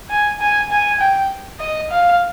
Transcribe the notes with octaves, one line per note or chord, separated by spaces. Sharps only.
G#5
G#5
G#5
G5
D#5
F5